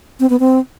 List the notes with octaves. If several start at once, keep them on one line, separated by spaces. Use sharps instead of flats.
C4
B3
C4